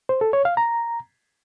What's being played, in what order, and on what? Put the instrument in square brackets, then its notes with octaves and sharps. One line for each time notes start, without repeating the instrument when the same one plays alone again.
[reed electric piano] C5
A4
C#5
F5
A#5